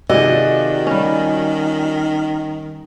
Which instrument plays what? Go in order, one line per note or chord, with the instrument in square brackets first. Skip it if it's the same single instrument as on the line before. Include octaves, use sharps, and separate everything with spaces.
[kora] C3 G#4 [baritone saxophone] D#3 [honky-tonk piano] F3 F#4 D5 [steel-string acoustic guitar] D#5
[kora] G3 C#4